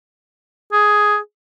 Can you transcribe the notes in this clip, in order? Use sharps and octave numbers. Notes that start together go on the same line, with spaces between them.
G#4